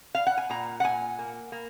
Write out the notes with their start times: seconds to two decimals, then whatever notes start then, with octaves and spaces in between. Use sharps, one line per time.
0.15 F5
0.27 F#5
0.38 G#5
0.50 A#2 A#5
0.80 F#5
0.84 A#2 G#5
1.19 A#3
1.52 A#3